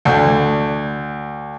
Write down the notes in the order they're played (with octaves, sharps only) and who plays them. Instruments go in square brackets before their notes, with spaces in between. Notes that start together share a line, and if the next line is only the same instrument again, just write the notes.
[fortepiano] D2